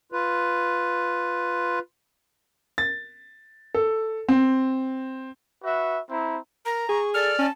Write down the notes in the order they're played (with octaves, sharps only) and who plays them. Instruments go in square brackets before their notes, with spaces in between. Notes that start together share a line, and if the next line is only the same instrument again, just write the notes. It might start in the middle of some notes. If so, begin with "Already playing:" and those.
[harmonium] F4 B4
[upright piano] A6
A4
C4
[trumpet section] F#4 B4 E5
C4 E4 A#5
[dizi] A#4 [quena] A#5
[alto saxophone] G#4 [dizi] C#6
[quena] A4 [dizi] D5 [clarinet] F6
[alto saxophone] C#4 [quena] A5